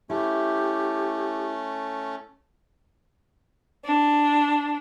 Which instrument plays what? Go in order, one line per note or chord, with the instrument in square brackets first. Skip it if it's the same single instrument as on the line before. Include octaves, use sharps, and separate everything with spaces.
[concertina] A3 C#4 [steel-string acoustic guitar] E4 [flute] G4
[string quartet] D4